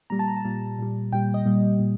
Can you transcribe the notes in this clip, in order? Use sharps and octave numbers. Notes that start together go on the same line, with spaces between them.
A#2 G3 A#5
A5
A#5
A5
A#2 G3
A#2 G3
A#2 G3 G5
D#5
A#2 G3
A#2